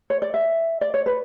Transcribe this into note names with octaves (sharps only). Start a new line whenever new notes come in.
C#5
D5
E5
D5
C#5
B4